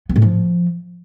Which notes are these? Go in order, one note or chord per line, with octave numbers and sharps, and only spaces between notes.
B3
A2
F3